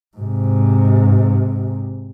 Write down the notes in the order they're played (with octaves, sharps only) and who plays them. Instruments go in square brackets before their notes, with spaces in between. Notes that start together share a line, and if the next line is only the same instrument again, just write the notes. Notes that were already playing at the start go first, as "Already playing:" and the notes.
[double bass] G#2 C3